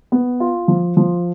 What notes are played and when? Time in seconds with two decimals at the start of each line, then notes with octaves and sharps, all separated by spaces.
0.12 B3
0.40 F4
0.68 F3
0.97 F3